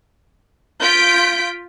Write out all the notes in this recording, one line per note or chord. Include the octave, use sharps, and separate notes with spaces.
F4 G6 B6 D7